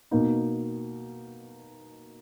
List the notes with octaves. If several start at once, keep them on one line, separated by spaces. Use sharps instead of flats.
B2 A#3 D#4